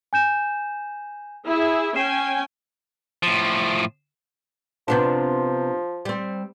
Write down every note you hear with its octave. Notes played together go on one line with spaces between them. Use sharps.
G#5 G6 E7
E4 G#4 E5
C#4 G5 G#5 C7 E7
A2 F3
C3 F3 B3 D4
G3 C4